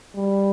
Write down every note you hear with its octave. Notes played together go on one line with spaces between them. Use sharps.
G3